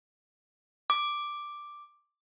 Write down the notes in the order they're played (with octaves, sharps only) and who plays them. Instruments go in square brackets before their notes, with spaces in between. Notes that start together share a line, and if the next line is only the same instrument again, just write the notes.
[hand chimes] D6